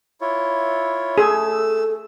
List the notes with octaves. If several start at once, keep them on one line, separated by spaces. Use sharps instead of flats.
E4 F4 C#5
A3 G#4 A4 G#5 E6